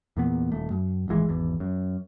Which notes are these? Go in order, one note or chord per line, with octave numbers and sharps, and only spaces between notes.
E2 A#2 B3
D#1 A3
F#2
D#1 G#1 E3 G#3
G#1 E2
F#2